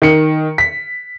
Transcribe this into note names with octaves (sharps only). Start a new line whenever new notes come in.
D#3 C#7
B6